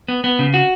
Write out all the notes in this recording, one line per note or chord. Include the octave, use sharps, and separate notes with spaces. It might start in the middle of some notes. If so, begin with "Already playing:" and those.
B3
B3
C#3
F#4